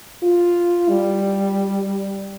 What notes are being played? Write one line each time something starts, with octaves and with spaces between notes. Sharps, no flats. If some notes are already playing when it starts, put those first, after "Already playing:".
F4
G3